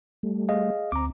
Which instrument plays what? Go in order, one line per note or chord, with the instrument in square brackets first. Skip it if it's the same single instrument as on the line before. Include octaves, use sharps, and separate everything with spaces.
[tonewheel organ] G3 A3
[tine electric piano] G#4 D#5 F5
[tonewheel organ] D2 C4 [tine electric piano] A#5 D6